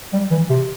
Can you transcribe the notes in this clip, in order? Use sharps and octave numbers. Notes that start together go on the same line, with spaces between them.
G3
E3
C3